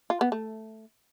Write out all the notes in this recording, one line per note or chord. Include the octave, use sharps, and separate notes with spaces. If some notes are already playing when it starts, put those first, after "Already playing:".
F4
B3
A3